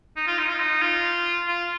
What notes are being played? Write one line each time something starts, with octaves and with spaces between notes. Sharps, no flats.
D#4
F4
D#4
F4
D#4
F4
F4